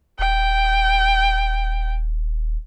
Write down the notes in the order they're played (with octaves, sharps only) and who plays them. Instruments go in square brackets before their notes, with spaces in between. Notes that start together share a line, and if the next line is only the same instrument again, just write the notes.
[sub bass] D#1 [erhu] G5